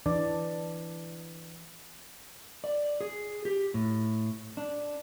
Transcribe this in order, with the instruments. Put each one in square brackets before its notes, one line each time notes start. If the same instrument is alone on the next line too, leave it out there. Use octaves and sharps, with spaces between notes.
[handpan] E3 D4 D5
[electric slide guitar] D5
G#4
G4
A2
D4